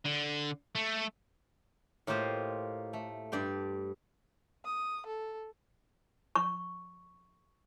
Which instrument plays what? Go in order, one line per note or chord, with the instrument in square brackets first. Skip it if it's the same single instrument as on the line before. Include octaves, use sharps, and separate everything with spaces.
[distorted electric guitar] D3
A3
[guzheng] A2 A#3 F4 G4 C5 D#5
A3
G2 D5 G5 C6
[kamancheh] D#6
A4
[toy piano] C#6